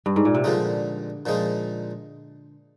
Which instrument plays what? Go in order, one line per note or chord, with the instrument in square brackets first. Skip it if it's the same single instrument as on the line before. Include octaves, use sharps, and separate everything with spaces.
[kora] G2
G#2
A#2
C3
[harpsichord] A#2 F3 G#3 D#4 [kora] D3
[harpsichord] A#2 F3 G#3 D#4